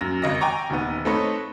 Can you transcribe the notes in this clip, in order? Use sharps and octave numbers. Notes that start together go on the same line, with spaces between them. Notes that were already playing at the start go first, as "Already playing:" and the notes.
F#2 A#6
G#1 D#5 A#6
G5 G#5 A#5 C#6 D6
D#1 D#3 B3
A3 C4 D#4 A4 B4 C#5